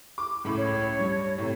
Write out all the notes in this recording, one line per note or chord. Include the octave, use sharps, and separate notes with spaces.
D6
C#2 A2 B5
C#5
G2
A2 C3